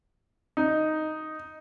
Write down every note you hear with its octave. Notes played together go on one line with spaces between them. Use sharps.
D#4